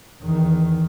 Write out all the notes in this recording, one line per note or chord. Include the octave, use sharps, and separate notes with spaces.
E2 D#3